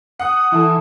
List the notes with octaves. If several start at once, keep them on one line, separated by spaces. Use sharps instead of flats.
F#5 D#6
E3 E4 A4